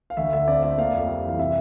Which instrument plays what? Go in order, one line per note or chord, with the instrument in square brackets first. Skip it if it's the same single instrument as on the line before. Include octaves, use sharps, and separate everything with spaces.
[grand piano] F5
D2 E5
D3 E5
C4 D5
A3 E5
A#3 F5
F2
G3
E3 F5
C3 E5